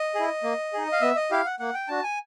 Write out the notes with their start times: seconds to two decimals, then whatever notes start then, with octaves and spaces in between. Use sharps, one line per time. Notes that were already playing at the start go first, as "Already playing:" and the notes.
Already playing: D#5
0.15 E4 G#4
0.43 A#3
0.73 D#4 G#4
0.92 F5
1.01 B3 E5
1.16 D#5
1.31 E4 G4 F5
1.46 F#5
1.59 A#3 F#5
1.74 G5
1.88 D4 F#4 A5
2.03 G#5